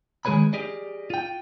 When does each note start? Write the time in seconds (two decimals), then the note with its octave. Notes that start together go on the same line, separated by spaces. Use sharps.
0.25 D#3 G#3 G#4 B4 C#5 B5
0.53 G4 G#4 D5 D#5
1.10 F4 G5